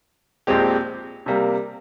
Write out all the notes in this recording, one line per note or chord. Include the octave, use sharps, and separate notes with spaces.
A#1 A#2 G#3 C4 G4
C3 G3 A#3